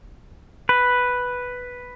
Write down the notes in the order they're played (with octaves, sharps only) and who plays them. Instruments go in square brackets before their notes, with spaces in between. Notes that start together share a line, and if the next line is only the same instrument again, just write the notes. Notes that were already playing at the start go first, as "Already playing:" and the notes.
[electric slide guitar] B4